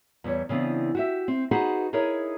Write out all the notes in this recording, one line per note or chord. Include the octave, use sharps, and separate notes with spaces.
E2 G3 C#5
C#3 E3 B3 C4 D4
F#4 G4 E5
C4
D#4 F#4 G#4 B4 C5 F#5
D#4 E4 G#4 A#4 C#5